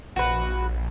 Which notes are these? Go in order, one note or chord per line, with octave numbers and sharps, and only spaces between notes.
A#1 F#4 B4